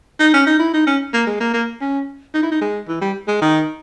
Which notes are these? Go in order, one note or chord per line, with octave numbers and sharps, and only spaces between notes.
D#4
C#4
D#4
E4
D#4
C#4
A#3
G#3
A#3
A#3
C#4
D#4
E4
D#4
G#3
E3
G3
G#3
D#3